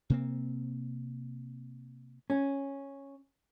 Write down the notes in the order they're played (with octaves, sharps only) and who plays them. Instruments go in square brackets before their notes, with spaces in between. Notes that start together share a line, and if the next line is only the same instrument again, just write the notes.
[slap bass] C3 A#3 C4
[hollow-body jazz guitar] C#4